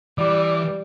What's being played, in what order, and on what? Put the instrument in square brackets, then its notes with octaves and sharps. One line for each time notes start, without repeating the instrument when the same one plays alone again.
[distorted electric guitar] E3 [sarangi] G3 [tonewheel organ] D5 D6